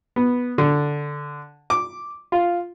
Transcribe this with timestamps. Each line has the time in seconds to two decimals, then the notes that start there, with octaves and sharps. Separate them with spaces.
0.16 B3
0.58 D3
1.70 D6
2.32 F4